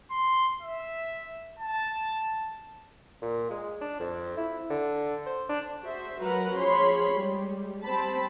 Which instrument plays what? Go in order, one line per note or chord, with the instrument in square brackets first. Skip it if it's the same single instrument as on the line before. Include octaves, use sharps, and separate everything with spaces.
[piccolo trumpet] C6
E5
A5
[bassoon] A#2
G#3
D4
F2
E4
D3
C5
D4
[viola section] F#4 G#4 C5 E5
F#3 F#4 A#4 B4 F#5 A#5
F3 C#4 G#4 C#5 B5 C6
G3 G#3 G4
G3 C4 C5 A5 B5